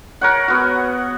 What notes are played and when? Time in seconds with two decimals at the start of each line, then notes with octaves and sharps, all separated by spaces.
0.21 A#4 C#5 F#5
0.48 B3 F#4